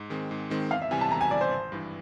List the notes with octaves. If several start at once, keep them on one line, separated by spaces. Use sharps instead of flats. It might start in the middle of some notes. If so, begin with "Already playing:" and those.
Already playing: G#2
D#3 G#3 C4
G#2
D#3 G#3 C4
E2 F5
E5
C3 E3 G3 G#5
A5
E2 A#5
G#5
C3 E3 G3 D5
C5
G#1
G2 E3